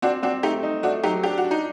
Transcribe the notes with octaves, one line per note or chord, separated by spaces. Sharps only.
C4 D4 F#4
C4 D4 F#4
A3 D#4 G4
D#4
A3 D4 F#4
F#3 D#4 G4
D4 G4
F#4
D4
D#4